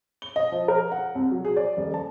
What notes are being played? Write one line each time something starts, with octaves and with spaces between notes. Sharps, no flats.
G7
D#5
F3
A#4
F#5
C2
F#3
G#4
D5
D#1
A5